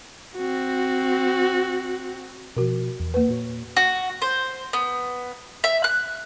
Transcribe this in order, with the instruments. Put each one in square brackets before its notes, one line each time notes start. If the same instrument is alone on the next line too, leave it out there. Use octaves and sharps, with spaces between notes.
[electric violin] C4 F#4
[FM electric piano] B2 F3 [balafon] F#4 A#4
[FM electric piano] E2
[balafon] A#3 B4
[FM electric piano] A#2 F#4 C#5
[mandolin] F#4
C5
B3
E5
F#6